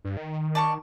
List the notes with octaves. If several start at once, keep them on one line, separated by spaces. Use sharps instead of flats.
G2
D#3
D5 A5 C#6